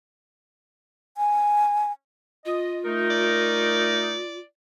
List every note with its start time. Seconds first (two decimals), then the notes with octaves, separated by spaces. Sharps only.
1.17 G#5
2.45 F4 D#5
2.85 A3 D#4 A#4
3.10 D5